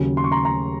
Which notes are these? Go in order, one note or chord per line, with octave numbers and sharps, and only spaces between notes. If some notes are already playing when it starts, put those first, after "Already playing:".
Already playing: D#2 C#3 F#3
C6
C#6
A#5 C6
A#5 C6